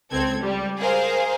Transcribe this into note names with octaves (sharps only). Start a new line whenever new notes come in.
C#2 C4 A4 G#6
G3
G#4 A#4 C5 F5